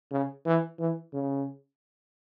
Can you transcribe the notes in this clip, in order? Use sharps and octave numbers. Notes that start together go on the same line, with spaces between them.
C#3
E3
E3
C#3